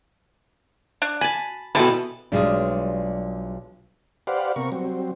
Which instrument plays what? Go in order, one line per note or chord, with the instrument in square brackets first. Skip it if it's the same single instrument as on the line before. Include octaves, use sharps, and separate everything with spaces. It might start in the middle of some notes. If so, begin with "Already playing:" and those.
[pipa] D4
[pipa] G#5 [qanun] A5 B5
[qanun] B2 A4 A5 [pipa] E3 G3 G#3
[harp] B1 F4 D#6 [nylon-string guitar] G3 G#3 D4
[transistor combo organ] G4 B4 C5 D5 F5 F#5
C3 B3 A#4 C#6
F#3 G3 C4